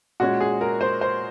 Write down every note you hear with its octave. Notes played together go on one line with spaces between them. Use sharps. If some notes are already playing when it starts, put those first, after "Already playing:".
A#2 G#3 C#4 F#4
G#4
A#4
C5
C5